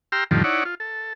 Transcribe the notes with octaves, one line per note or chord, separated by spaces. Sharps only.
G4 G5 A#5 C6 E6 F6
F2 A2 D3 D#3 F3 G3
D#4 E4 C#5 D5 F#5
F4
A4